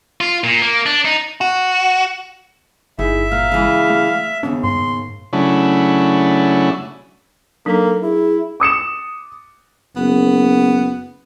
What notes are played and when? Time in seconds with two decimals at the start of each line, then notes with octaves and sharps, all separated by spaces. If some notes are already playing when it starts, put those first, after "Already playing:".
0.21 F4
0.44 A#2
0.62 A#3
0.86 D4
1.05 D#4
1.41 F#4
2.99 G1 D#4 E4 G#4 E5
3.32 A#2 F5
3.52 C#3 E3 G#3
3.90 A3
4.43 D#2 C#3 B3 D4
4.64 G#2 C6
5.33 C#3 F#3 A3 C#4 D4 E4
7.66 F#3 A#3 D4 D#4 A4
8.03 E4 G#4
8.60 D6 D#6 C#7 E7
9.96 F#1 B3